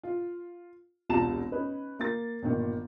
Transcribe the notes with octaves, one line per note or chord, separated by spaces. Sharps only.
F4
E1 C2 F4 A5 A#5 E7
C#4 D#4 B4
A#3 A6
G1 A#2 D#3